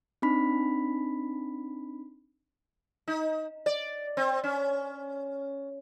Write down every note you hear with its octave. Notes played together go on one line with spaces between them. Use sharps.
C4 D4 D#4 B5 B6
D#4
D5
C4
C#4